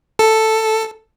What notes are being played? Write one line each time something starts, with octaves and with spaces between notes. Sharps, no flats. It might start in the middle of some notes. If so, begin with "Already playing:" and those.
A4